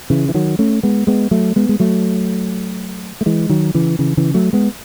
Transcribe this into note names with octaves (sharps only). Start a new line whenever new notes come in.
C#3 E3
E3
D#3 F#3
A3 C#4
G#3 B3
G#3 B3
F#3 A3
G#3 B3
G#3
F#3 A3
A3
E3 G#3
D#3 F#3
C#3 E3
C#3 E3
C#3 E3
F#3 A3
G#3 B3